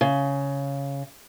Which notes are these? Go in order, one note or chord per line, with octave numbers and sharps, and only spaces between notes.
C#3